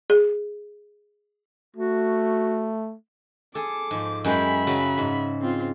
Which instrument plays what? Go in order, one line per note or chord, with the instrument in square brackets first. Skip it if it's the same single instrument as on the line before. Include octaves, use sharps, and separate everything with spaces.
[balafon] G#4
[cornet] A3 [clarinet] F#4
[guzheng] G#4 A4 [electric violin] D6
[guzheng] G#2 F3
[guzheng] F#2 G#3 G5 [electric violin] E5 B5
[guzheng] C#3 F#3
G#2
[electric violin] C4 F4